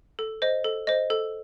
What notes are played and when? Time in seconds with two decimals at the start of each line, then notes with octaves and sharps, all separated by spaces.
0.19 A4
0.42 C5 D#5
0.64 A4
0.87 C5 D#5
1.10 A4